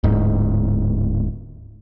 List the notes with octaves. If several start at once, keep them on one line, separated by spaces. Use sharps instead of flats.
D1 G#2